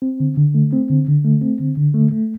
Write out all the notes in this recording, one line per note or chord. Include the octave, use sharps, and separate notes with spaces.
C4
D3
D3
A3
C4
D3
D3
A3
C4
D3
D3
A3
A3